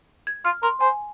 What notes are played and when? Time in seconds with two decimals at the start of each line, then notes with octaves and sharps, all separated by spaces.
0.27 G#6
0.45 F4 F6
0.63 A#4 C6
0.81 C5 G#5